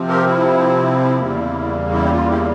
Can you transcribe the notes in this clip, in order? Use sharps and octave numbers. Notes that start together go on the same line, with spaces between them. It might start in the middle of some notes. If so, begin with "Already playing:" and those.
Already playing: C3 F3 C4
G4 A#4
E4
E2 C#3 G3 A#3
E4
G4
F4
E4 G4